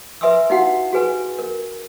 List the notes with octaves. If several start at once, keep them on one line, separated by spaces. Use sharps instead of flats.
B4 E5 G#5 C6 D#6 E6
D#4 E4 F#4 F5 F#5 C6
F#4 G#4 B4 G#5
A#4